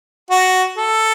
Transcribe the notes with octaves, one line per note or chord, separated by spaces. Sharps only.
F#4
A4